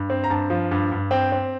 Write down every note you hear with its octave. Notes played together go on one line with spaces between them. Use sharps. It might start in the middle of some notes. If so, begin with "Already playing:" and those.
Already playing: G2
C4
A#5
G2 A5
F3
G2
G2
C4 G5
C4